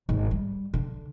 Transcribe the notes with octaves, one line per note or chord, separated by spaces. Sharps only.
G#1
G3
D3